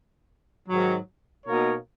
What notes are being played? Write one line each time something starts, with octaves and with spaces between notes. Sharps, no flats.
G#2 D#3 F#3
B2 A#3 D#4 A#4 C#5